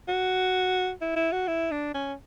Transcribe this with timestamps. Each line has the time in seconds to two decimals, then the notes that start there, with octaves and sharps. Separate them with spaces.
0.08 F#4
1.01 E4
1.16 E4
1.32 F#4
1.48 E4
1.71 D4
1.94 C#4